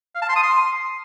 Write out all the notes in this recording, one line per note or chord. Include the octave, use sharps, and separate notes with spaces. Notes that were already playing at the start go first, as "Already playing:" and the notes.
F5
A5
C6
D#6
C6